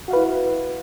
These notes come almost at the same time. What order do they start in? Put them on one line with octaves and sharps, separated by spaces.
F#4 F5 B4 E4